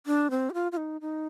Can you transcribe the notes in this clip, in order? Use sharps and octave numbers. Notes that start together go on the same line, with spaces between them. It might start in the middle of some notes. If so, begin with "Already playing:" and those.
D4
C4
G4
F4
F4
D#4
D#4